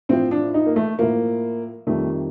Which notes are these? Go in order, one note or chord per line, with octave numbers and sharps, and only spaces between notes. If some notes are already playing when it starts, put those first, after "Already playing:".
A2 F3 C4
D4
D#4
A#3
A3
A2 F3 A#3
F2 D#3 G3 A3